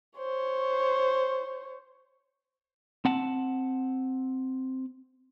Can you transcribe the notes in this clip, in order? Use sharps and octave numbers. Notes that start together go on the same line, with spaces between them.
C5 C#5
C4 F#5 A5